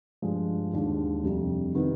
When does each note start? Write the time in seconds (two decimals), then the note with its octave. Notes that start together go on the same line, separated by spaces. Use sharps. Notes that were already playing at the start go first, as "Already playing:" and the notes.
0.22 G2 F3 G#3
0.73 D#2 D3 G#3 D4
1.24 F2 C3 G3
1.75 C3 D#3 B3 D#4